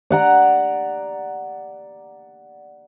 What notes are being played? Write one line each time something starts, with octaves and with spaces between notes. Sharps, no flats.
D5 F#5 A#5